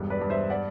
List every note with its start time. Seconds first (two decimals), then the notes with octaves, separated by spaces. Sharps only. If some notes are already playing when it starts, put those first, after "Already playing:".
Already playing: E1 G2
0.10 B4 D5
0.21 G2
0.30 C5 E5
0.50 D5 F#5